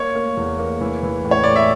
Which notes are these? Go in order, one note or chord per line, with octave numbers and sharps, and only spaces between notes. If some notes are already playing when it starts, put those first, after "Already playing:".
Already playing: A#3 C#5
A#3
E2
A#3
E3
E3
A2
C#5
A2 D5
E5